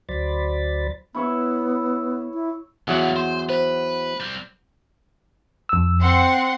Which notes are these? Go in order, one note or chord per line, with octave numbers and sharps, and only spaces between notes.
D2 F#3 C5 D5 B5 A6
B3 E4 C#5 E5
E4
E2 F#3 G3 A#3 F#5
C5 C6
B4 C5
G3 C4
F2 E6
C4 F#5 C6